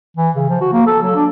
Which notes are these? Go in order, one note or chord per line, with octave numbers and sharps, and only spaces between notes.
E3
C#3
F3
F#4
A#3
A4
F#3
D4